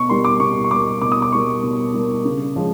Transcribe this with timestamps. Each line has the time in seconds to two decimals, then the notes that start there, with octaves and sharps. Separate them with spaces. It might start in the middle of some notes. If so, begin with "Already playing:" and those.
Already playing: B2 C#6
0.09 G3 A#3 C6
0.25 D6
0.40 B2 C#6
0.64 C#6
0.71 G3 A#3 D6
1.02 B2 D6
1.12 D#6
1.22 D6
1.32 G3 A#3 C#6
1.63 B2
1.94 G3 A#3
2.25 C#3
2.56 F3 G#3 C#4